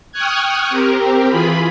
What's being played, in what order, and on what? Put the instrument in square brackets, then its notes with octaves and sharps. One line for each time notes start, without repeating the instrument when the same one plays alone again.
[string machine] G5 C#6 D#6 F6 F#6 G#6
C4 G4 A#4
E3 F4 G#4 B5